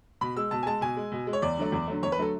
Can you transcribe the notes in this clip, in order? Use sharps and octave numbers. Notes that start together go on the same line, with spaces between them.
B2 B5
G#3 E6
B2 A5
G#5
G#3 A5
B2 G#5
G#3
B2
G#3
C#5
E2 D5
D3 F#3 A3
E2
D3 F#3 A3
E2 C#5
B4
D3 F#3 A3 A4